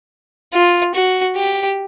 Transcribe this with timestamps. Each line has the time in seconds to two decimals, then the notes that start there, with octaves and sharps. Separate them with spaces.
0.54 F4
0.94 F#4
1.36 G4